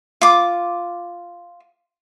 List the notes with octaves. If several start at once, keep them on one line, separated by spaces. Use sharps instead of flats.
F4 D6